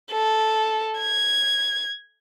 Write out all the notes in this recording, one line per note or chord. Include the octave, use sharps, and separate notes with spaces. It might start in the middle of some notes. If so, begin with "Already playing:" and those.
A4
G#6